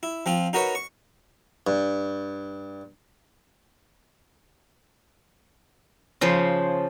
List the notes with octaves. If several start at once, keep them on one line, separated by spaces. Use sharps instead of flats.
E4
F3 C4 F4
D#4 F#4 A#4 B4 C#5
C#6
G2
C#3 F3 C5